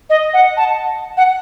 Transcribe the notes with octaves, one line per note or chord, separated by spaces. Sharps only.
D#5
F#5
A5
F#5